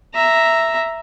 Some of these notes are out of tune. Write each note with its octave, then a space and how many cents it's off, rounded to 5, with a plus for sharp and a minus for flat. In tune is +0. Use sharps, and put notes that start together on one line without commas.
E5 +0 A#5 +0